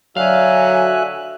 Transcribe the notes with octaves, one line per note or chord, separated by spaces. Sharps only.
D3 F#3 F#4 E5 F5 G#5 F#6